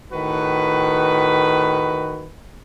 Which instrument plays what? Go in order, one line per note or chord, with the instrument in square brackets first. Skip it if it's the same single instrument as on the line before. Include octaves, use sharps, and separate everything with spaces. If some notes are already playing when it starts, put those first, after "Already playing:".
[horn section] A2 D#3 F#4 B4